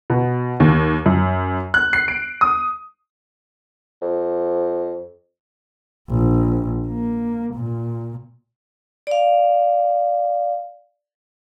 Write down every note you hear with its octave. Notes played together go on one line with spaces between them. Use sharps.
B2
D#2
F#2
F#6
C7
D7
D#6
F2
A#1
A#3
A#2
D5 F5